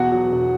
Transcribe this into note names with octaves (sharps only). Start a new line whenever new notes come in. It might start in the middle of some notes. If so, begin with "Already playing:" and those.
Already playing: E2 B2 F#4 F#5
F#3
E1